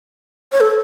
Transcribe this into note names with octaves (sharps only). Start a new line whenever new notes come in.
C#5
A4